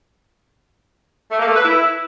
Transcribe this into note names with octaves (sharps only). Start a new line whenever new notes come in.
A3
A#3
A3
B4
E4